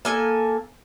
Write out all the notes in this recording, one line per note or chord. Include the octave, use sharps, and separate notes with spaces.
A#3 A4 G#5